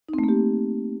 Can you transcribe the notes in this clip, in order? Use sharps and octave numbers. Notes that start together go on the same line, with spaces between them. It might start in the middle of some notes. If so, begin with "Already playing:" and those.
A3 A#3 C4 D#4 G4